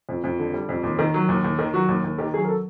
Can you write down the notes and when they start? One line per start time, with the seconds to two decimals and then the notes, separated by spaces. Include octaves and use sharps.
0.09 F2
0.24 F2
0.39 D3
0.54 G3
0.69 F2
0.83 D#2
0.99 D#3
1.14 F#3
1.29 D#2
1.44 D#2
1.59 D#3
1.74 F#3 F#4
1.89 D#2
2.04 D#2
2.18 D#3 G4
2.34 F#3 G#4
2.44 A#4
2.49 A4